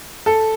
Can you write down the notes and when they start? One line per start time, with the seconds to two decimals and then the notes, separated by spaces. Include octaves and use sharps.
0.26 A4